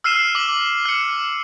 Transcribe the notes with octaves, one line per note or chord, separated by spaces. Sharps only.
E6 F6 C7 D#7 E7
D6 F#7
F6 C#7